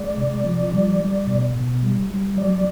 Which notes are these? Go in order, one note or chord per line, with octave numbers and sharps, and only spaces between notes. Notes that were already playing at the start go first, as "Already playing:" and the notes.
Already playing: G#3 D5
C3
F3
G3
G3
B2
B2
G3
G3
F#3 D5